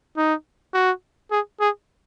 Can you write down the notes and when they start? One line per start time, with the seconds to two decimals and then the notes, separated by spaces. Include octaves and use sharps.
0.17 D#4
0.74 F#4
1.31 G#4
1.61 G#4